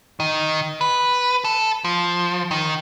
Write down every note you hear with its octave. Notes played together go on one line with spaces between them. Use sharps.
D#3
B4
A4
F3
D#3